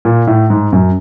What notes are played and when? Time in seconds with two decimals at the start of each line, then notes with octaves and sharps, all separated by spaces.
0.05 A#2
0.27 A2
0.50 G#2
0.72 F#2